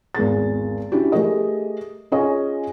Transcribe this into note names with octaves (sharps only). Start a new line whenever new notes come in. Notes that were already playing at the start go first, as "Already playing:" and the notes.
G#1 E2 G#4 A6
C#4 D4 E4 F#4 G4
A3 G4 G#4 A#4 D#5
C#4 F4 G#4 C#5 D#5 G#5